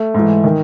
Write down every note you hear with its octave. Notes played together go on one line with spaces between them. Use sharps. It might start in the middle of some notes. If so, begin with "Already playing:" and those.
Already playing: A3
G#2 E3
D#3